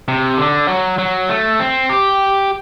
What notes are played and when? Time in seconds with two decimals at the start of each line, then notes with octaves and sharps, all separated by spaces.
0.08 C3
0.38 D3
0.68 F#3
0.98 F#3
1.29 A3
1.60 C4
1.89 G4